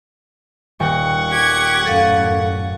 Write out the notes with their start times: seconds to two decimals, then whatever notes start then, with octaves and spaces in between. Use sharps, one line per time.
0.80 D#1 F#5 G5 C#6 A#6
1.30 G4 G#6
1.86 F#2 A2 A4 F5 D#7